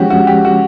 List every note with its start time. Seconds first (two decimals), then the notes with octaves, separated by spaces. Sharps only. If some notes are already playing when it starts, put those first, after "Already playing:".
Already playing: F3 G#3 C#4 F#4 G4
0.10 F#4
0.27 G4
0.45 F#4